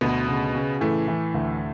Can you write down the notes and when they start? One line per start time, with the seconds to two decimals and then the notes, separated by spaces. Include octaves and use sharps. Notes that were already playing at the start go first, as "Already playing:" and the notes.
0.01 D2 B2 B3
0.27 C#3
0.55 C#3
0.80 A2 E3 A3
1.08 E3
1.34 D2